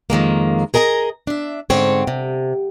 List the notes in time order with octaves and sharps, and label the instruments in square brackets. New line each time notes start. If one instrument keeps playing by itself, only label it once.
[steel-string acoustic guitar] F2 D#3 G#3 A#3
G#4 A#4 D#5 A5 A#5
D4 E5
G#2 D3 C4 C#5
C3